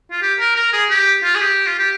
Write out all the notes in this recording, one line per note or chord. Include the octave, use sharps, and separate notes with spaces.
F4
G4
A#4
A#4
G#4
G4
F4
G#4
G4
F4
G4